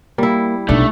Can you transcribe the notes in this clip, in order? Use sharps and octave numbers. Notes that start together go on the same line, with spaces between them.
G3 A#3 E4
B1 A3 D4 F4